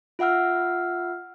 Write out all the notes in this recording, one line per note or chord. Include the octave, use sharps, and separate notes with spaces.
F4 E5 F#5 E6 F6